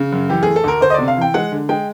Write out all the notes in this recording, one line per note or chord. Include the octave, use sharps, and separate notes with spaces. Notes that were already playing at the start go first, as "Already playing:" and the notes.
Already playing: C#3
F#2
E3 G4
A3 G#4
A4
D2 A#4
D2 C5
D#5
C3 D5
F5
E3 G5
G#3 F#5
D3
G#3 G5